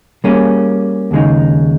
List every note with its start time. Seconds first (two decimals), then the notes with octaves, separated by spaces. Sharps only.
0.24 G3 A#3 C#4 G#4
1.11 D#2 C#3 G#3 D#4